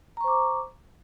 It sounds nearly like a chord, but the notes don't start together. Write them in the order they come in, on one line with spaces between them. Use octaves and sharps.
A#5 C#6 C5 D6